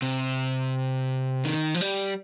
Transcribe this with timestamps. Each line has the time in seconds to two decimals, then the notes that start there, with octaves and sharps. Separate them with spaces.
0.02 C3
1.45 D#3
1.74 F3
1.81 G3